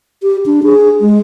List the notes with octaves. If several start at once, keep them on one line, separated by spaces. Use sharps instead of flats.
G4
D4
G#4
G#3